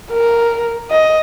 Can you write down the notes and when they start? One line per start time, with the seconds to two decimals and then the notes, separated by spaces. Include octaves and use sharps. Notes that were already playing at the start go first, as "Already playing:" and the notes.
0.11 A#4
0.91 D#5